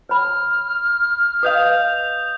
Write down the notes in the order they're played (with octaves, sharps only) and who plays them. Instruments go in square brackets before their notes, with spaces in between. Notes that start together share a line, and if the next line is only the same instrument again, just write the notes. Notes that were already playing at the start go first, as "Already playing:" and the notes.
[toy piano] C#5 B5 [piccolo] F6
[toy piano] B4 D#5 F5 [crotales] D#6 G6 F7